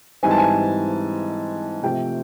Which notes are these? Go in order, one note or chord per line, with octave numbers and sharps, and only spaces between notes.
G#2 E3 G3 C4 G#5
A5
G#5
C3 F3 A3 C4 G5